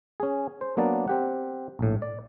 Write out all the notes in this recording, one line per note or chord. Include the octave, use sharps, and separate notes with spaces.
C#4 G#4
C5
F#3 A#3 B3 D4 D5
C4 G4 F#5
A#1 A2
D5